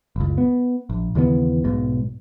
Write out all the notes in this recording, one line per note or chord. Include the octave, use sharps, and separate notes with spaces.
F#1 C#2
B3
A#1
D#2 C#3 E3 B3
B1 G#2 B2